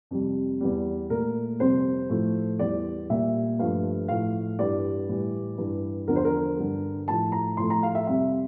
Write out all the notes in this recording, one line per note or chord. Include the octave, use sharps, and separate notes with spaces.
F2 C3 G3
E2 E3 G3
A#2 A3 A#4
F2 C3 G3 C5
A2 F3 A3
E2 E3 G3 D5
A#2 G3 E5
G2 F3 A3 F5
A2 F3 A3 F5
G2 E3 G3 D5
A2 E3 G3
G2 E3 G3
E2 D3 F3 A#4
C5
A#4
G2 D3 G3
A2 F3 A3 A5
A#5
A2 F3 A3 C6
A#5
F5
E5
F2 C3 G3 E5